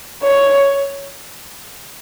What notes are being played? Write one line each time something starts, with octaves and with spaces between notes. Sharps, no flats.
C#5